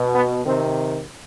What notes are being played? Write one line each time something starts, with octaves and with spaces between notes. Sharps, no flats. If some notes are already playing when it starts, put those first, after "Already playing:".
Already playing: B2
B3
C3 D#3 C4